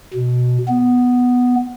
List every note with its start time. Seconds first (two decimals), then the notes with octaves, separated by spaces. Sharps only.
0.13 B2
0.68 B3